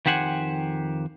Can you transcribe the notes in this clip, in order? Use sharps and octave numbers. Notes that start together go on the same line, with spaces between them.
F2 D#3 G4 C5 F#5 G#5